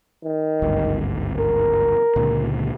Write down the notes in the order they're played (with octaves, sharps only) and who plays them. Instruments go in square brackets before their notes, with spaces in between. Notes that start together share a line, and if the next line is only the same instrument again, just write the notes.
[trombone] D#3
[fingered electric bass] G#1 D2 G2
[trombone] A#4
[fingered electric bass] C#2 A#2 D3